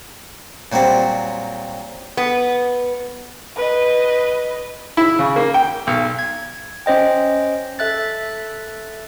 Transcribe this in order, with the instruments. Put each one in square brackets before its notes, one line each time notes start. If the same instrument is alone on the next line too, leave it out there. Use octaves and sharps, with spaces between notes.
[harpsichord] A#2 F#3 G3 C4
[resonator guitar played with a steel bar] B3
[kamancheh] B4 D#5
[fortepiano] E4
C#3
A#3
G5
B1
[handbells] G#6
C#4 C5 D#5 G5
A4 E5 F#6 A6